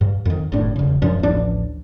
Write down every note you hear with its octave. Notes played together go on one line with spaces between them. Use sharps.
G2
F2 D#3
F#1 A2 D4
E1 C#3
E1 F#2 F3 D4
A1 D2 F3 D4